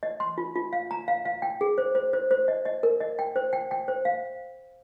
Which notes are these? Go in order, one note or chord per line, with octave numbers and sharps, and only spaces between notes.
D#5
C6
F4
F4
F5
A#5
F5
F5
G5
G#4
C5
C5
C5
C5
D#5
D#5
A#4
D#5
G5
C5
G5
G5
C5
F5